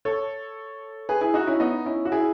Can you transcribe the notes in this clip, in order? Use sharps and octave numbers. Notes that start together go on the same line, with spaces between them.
A4 C#5
G#4 B4
E4 G#4
D#4 F#4
C#4 E4
B3 D#4
C#4 E4
F#4
E4 G#4